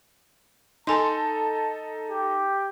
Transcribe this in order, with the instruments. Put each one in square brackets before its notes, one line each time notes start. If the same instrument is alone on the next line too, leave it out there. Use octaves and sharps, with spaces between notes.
[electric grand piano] D#4 A4 [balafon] G#5 C6 [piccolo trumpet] A5
[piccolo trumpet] G4